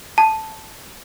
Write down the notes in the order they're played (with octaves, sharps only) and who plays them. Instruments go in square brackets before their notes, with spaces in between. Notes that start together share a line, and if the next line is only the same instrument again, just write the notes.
[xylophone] A5